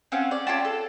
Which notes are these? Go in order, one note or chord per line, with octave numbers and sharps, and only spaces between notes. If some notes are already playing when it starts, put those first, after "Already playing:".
C4 C#4 F5 F#5
D5
C#4 F4 G4 A5
A4